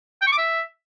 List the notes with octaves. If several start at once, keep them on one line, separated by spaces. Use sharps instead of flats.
G5
C#6
D6
E5